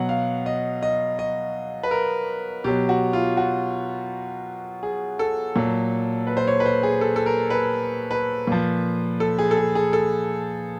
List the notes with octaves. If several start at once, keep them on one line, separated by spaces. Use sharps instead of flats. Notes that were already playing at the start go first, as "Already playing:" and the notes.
Already playing: B2 F#3 F#5
F5
D#5
D#5
D#5
B4
A#4
B2 F#3 G4
F#4
F4
F#4
G#4
A4
A#2 F#3
B4
C5
C#5
B4
C5
G#4
A4
A4
A#4
B4
B4
A#2 F3
A4
G#4
A4
G#4
G#4
A4